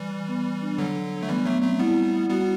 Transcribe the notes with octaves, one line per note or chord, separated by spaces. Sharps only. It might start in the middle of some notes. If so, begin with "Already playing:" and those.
Already playing: E3 G3
B3
D4
D3 F#3
A3
E3 G3 B3
F#3 A3 B3
F#3 A3 C4
G3 B3 E4
G3 B3 F#4